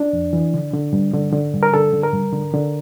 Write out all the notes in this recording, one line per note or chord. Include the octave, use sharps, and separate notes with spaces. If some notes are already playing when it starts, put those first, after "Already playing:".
Already playing: D4
F2
E3
D3
D3
G2
D3
D3
G2
A#4
D3 A4
D3
A#4
G2
D3
D3